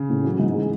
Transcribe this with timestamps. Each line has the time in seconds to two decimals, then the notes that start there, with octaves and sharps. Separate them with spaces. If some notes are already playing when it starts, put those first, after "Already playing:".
Already playing: C#3
0.09 A2
0.24 E3 F#3
0.40 G#2
0.54 G#3